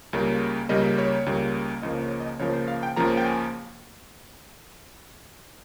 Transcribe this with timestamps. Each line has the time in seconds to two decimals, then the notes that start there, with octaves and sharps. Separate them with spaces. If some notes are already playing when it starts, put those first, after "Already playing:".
0.13 C#2 C#3 G3 A#3
0.69 C#2 C#3 G3 A#3 D#5
0.98 C#5
1.26 C#2 C#3 G3 A#3
1.82 C#2 C#3 F3 A#3 D#5
2.02 C#5
2.20 D#5
2.39 C#2 C#3 F3 A#3 C#5
2.53 C5
2.68 F5
2.83 G5
2.97 C#2 C#3 F3 A#3 A#5
3.17 G5
3.25 G#5